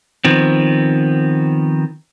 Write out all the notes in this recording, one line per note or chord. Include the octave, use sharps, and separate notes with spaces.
D#3 F3 B3 C4